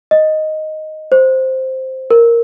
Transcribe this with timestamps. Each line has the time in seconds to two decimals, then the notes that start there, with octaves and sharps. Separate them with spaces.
0.11 D#5
1.12 C5
2.11 A#4